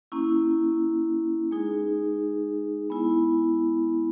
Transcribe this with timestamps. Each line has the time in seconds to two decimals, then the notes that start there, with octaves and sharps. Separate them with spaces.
0.12 A#3 C#4 E4
1.51 G#3 D#4 G#4
2.90 G#3 B3 E4